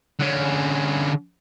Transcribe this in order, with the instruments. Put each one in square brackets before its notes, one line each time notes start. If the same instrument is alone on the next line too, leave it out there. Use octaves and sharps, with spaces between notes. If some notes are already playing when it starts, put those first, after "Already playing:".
[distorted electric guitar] D3 C#4